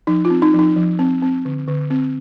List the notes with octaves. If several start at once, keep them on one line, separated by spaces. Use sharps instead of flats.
F3 D#4
F4
C4
D#4
F3 D#4
F3
C4
C4
D3
D3
C4